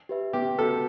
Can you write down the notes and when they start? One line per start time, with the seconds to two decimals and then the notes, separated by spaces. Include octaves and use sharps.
0.09 G4 B4 E5
0.33 B3 G4
0.58 F#4 A4 B4